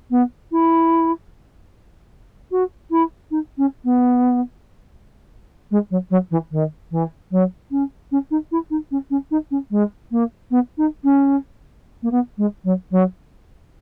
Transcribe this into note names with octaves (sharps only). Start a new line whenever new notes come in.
B3
E4
F#4
E4
D#4
C#4
B3
G#3
F#3
F#3
E3
D#3
E3
F#3
C#4
C#4
D#4
E4
D#4
C#4
C#4
D#4
C#4
G#3
A#3
B3
D#4
C#4
A#3
B3
G#3
F#3
F#3